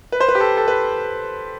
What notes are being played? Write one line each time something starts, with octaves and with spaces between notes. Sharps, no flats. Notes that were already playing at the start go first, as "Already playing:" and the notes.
B4
C5
B4
G4
A4
A4
B4